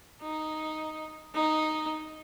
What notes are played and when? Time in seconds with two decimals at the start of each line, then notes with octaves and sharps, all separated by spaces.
0.22 D#4
1.35 D#4